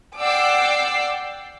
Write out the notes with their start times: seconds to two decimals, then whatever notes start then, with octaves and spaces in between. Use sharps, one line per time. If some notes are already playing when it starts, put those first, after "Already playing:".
0.17 D5 F#5 G5 D6 E6 C7